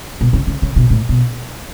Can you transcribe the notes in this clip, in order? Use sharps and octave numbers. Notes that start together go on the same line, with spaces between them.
B2
C#3
C#3
C#3
B2
A2
B2